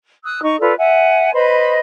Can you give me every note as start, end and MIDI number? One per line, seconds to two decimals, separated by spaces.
0.24 0.41 87
0.24 0.41 88
0.24 0.41 90
0.42 0.57 63
0.42 0.57 85
0.60 0.74 65
0.60 0.74 69
0.60 0.74 71
0.60 0.74 74
0.78 1.33 76
0.78 1.33 78
0.78 1.33 80
1.33 1.80 71
1.33 1.80 72
1.33 1.80 75
1.33 1.80 83